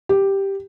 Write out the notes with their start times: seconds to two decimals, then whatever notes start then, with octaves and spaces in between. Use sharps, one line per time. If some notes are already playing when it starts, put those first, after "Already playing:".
0.09 G4